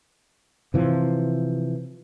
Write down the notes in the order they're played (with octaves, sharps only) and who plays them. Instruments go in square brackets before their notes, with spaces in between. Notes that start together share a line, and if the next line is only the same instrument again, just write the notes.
[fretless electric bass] C3 E3 F3